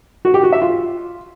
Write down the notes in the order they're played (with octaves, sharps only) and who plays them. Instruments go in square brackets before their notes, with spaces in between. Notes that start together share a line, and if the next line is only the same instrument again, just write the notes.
[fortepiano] F#4
G4
F#4
E5
F4